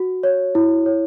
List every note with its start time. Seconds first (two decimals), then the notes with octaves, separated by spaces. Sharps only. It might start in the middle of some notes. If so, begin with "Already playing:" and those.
Already playing: F#4
0.23 C#5
0.55 E4
0.86 C#5